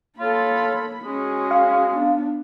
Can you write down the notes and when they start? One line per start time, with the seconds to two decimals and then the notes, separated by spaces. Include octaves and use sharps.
0.19 A#3 F4 A4 C#5 B5
1.04 G#3 C#4 F#4 G#4 D#6
1.51 F5
1.92 B3 D4